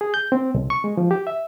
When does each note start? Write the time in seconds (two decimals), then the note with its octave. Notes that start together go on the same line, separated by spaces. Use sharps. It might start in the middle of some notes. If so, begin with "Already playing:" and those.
0.01 G#4
0.14 G6
0.32 C4
0.54 C2
0.70 C#6
0.84 G#3
0.97 F3
1.11 G4
1.27 E5